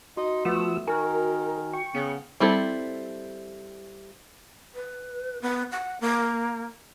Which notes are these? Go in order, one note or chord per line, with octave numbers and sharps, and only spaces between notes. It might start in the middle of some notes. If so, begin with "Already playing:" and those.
D#4 F#4 C6
F3 A3 B3 E6
D#3 F#4 A#4 G#5 F6
G5 C#6
C#3 B3
G3 C4 E4 A4
B4
B3
F#5
A#3